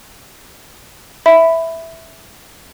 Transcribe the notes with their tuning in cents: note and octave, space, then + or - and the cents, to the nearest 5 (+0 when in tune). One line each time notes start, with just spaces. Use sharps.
E5 -5 B5 +10